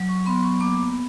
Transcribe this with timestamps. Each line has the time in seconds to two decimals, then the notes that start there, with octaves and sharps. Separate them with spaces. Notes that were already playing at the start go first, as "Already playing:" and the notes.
Already playing: F#3
0.09 C#6
0.26 B3 C6
0.43 C#6
0.60 A#3 D6